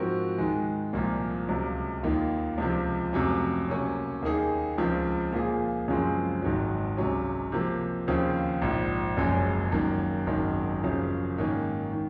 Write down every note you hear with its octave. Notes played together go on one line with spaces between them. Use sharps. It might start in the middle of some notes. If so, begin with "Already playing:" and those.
Already playing: G#2 F3 C4 F#4 A#4
G#2 D#3 G#3
C2 A#2 F3
C#2 C3 F#3
D#2 D#3 A#3 F4
C#2 C3 F3
F1 F2 C3 F#3 C#4
C3 F#3 A#3 C#4
D#2 D#3 A#3 D#4 G#4
C#2 C#3 F3 C4
A#2 F3 A#3 F4 G#4
F#2 C#3 F3 G#3 C4
G#1 G#2 D#3 F#3
C#2 C3 F#3 C#4
C3 F3 A#3
D#2 C#3 F3 C4 F4
A#1 G#2 F3
F#1 F#2 F3 G#3
F#2 D#3 A#3
G#1 F#2 D#3
F#2 C#3 F3
G#2 D#3 A#3 C#4
D#3